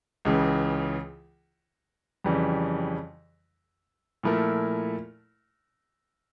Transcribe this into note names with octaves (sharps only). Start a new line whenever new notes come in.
C#2 C#3 E3
F2 C#3 E3 G3
A#2 F3 A3 E4 A#4